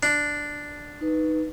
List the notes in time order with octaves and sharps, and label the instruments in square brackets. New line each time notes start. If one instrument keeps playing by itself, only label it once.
[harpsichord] D4
[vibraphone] D#4 B4